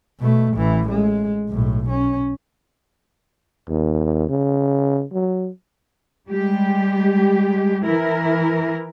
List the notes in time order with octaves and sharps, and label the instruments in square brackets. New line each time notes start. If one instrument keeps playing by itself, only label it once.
[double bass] B2 A3
A1 E3
G#3
B1 A2
C#4
[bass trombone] D#2
C#3
F#3
[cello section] G3 G#3 G4
E3 E4 A#4